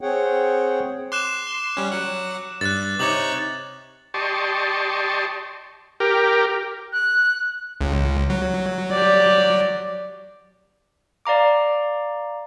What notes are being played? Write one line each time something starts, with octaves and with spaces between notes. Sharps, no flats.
C4 G#4 C#5 F#5 G5
C6 D6 F#6 E7
G3 C#4
F#3 F#5
G2 F#6 A6
C3 D#4 C#5 D6 F#7
G4 D5 D#5 A5 C6 C#6
G4 A#4
F#6
C#2
F#3
G4 D5
D5 F5 A#5 D6